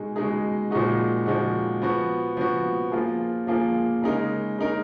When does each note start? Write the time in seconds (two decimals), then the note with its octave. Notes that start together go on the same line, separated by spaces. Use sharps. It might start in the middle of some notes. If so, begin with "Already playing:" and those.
Already playing: B2 G#3 D#4 G#4
0.16 B2 G#3 D#4 G#4
0.71 A#2 F3 G#3 D#4 F#4
1.26 A#2 F3 G#3 D#4 F#4
1.82 F3 B3 F#4
2.37 F3 B3 F#4
2.92 F3 A#3 F4 G#4
3.47 F3 A#3 F4 G#4
4.02 C#3 G#3 D#4 A#4
4.58 C#3 G#3 D#4 A#4